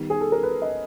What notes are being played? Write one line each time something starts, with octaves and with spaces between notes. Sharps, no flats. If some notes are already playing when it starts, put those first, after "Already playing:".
Already playing: D#3 G3 B3
G#4
A4
A#4
B4
D#5